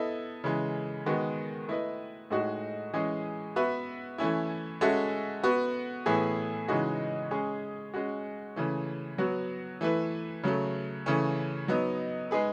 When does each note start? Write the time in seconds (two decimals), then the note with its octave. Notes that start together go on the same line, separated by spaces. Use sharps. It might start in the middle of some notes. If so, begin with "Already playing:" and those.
Already playing: B3 E4 A4 D#5
0.44 C#3 E3 G#3
1.06 D#3 G#3 B3 F#4
1.69 A3 E4 B4 D#5
2.31 A2 G#3 D#4 F#4
2.93 E3 G#3 C#4 G#4 D#5
3.56 B3 F#4 B4 E5
4.18 E3 A3 C#4 E4
4.81 G#3 C#4 F#4 A4 E5
5.43 B3 F#4 B4
6.06 A2 E3 B3 E4 G#4
6.68 C#3 E3 G#3 D#4 F#4
7.31 G#3 C#4 G#4
7.94 G#3 C#4 F#4
8.56 C#3 E3 A3
9.18 F#3 B3 F#4
9.81 E3 A3 E4 B4
10.43 C#3 F#3 A3
11.06 C#3 E3 A3 C#4
11.68 F#3 B3 D#4
12.31 G#3 D#4 G#4 B4